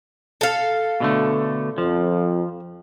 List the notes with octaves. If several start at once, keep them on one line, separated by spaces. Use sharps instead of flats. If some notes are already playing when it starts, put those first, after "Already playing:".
A4 F5
B2 D3 A3
F2 F3